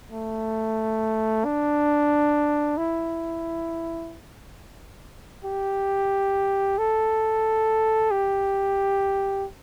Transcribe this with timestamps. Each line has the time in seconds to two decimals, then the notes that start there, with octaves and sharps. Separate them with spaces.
0.12 A3
1.45 D4
2.78 E4
5.44 G4
6.78 A4
8.11 G4